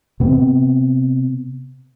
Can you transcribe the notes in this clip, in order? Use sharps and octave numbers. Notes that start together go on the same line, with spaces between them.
C3 B3 C4